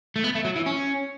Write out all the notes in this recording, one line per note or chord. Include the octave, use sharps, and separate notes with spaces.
A3
B3
A3
F#3
E3
C#4